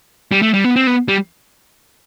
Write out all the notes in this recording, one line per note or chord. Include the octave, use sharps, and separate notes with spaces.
G3
A3
G3
B3
C4
B3
G3